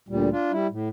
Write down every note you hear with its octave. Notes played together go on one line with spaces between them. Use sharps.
D2 A#2 G3
D4 F4
G3 E4
A2